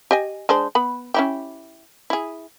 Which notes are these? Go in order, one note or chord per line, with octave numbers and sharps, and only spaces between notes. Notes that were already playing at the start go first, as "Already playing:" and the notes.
G4 D#5 G#5
G#3 D4 C5
B3 B5
C#4 E4 G4
E4 G#4